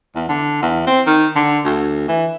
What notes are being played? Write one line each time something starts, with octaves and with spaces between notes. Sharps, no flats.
E2
D3
E2
C4
D#3
D3
D2
E3